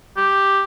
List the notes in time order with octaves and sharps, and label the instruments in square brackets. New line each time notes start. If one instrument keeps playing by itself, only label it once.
[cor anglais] G4